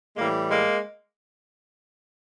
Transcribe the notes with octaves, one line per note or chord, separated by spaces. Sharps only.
A2 E3 G3 G#3 A#3
G#3 A#3